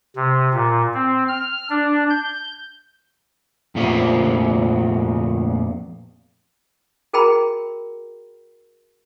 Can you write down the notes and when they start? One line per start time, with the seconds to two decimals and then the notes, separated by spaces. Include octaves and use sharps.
0.16 C3
0.54 A#2
0.94 C4
1.28 F6
1.70 D4
2.10 G6
3.75 F2 A#2 A3 B3 C4
7.13 F#4 G#4 A#4 G5 A#5 B5